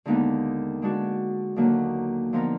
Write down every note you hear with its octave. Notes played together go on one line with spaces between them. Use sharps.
D#2 D3 G#3 B3 D#4
D3 G#3 D4 F#4
D#2 D3 F#3 A#3
D3 F3 B3 D#4 A#4